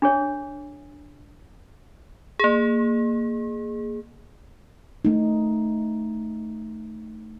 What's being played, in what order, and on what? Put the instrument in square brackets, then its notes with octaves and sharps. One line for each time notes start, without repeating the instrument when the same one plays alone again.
[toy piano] D4 G#4 C#5
[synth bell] A#3 G#4
[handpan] A3 D#4